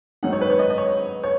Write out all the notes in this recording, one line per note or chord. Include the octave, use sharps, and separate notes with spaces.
G#2 D#3 F#3 D#4 F#5
C#5
B4
C#5
D#5
D#5
C#5
C#5